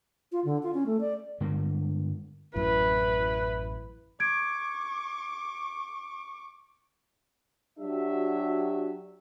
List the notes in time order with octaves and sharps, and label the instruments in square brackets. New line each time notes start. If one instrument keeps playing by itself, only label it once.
[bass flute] F4
D3
F4
C#4
A3
D5
[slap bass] G2 D3 G#3 A#3
[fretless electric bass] A1 F#2 [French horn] E4 [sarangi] B4
[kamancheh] C#6 D6 [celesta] G#6 D7
[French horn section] F#3 D4 G4 [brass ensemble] F#4 E5